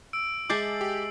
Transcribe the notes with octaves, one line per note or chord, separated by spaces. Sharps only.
E6 D7
G#3 E5 A5 D6 G6 A6 C7 F#7
G4